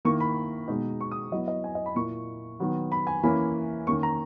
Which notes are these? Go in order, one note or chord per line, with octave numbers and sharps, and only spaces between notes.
D#3 A#3 E4 C#6
B5
B2 G#3 D#4
C#6
D#6
F#3 B3 E4 D#5
D#5
G#5
D#5
B5
A#2 A#3 E4 C#6
D#3 F#3 B3
B5
G#5
E3 A#3 C#4 E4 B5
D#3 A#3 C#4 C#6
A#5